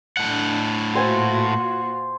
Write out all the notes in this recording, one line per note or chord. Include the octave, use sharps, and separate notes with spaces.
A2 D4 F#5
A#2 F4 F#4 C5 G#5 C6